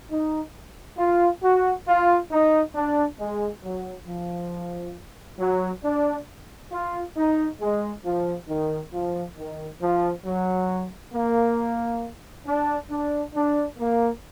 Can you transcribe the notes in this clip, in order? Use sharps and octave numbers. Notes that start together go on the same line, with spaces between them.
D#4
F4
F#4
F4
D#4
D4
G#3
F#3
F3
F#3
D4
F4
D#4
G#3
F3
D#3
F3
D#3
F3
F#3
A#3
D4
D4
D4
A#3